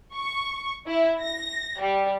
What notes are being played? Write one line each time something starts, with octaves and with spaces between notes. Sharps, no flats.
C#6
E4
A#6
G3